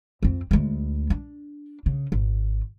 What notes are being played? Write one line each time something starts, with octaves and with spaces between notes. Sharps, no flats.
F2 C4
D2 G#3
D4
C#3
G#1